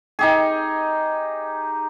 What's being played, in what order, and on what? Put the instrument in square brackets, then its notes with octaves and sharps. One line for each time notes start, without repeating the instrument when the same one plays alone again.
[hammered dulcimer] D#4 G4 G#4